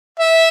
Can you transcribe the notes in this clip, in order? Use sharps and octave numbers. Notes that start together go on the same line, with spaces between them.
E5